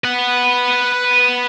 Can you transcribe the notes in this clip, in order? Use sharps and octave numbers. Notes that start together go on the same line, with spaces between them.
B4 F#5